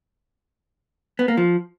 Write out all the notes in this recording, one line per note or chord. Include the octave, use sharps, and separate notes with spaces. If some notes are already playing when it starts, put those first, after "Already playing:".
B3
A#3
F3